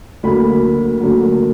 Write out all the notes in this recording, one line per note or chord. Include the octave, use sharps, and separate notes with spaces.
D2 D3 F#3 A#3 B5
D2 D3 F#3 A#3